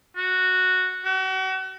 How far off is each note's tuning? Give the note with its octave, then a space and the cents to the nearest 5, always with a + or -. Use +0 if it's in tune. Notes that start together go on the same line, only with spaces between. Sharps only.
F#4 -5
F#4 +40